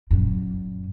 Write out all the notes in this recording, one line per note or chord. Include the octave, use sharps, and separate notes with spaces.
F#2 A#2